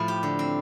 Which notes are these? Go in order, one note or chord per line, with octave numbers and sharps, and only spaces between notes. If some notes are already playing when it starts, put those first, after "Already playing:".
Already playing: A2 F3 A3 B5
G4
D3
C4